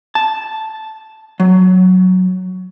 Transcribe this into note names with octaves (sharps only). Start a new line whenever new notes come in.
A5
F#3